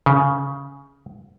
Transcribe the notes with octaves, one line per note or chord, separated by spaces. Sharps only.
C#3